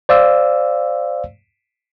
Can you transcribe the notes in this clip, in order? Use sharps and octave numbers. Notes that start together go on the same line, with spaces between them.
C5 D5 F5 E6